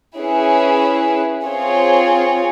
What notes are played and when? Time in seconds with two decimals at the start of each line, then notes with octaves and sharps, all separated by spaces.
0.18 C#4 E4 G#4 B4
1.45 C4 F4 G#4 C#5